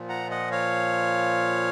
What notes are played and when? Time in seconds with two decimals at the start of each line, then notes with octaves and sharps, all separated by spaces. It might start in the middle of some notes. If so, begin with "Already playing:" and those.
Already playing: A#2 F3
0.09 F#5 A#5
0.30 D#5 F#5
0.52 C#5 F5